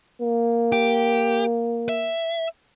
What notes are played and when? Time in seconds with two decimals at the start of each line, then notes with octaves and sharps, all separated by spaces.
0.22 A#3
0.72 G4
1.89 E5